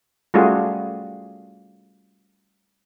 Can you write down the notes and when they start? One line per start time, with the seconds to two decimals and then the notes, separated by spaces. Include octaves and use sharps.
0.34 G3 A3 C#4 F4 F#4 G#4